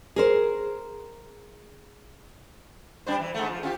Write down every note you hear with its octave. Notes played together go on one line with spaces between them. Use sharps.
G#4 A#4 C5
G3 D4 C5
E3
G#2 A3
F3
C#4 F4 G4